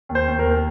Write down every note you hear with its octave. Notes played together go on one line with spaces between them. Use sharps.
D#2
C5
D#2
A#4
D#2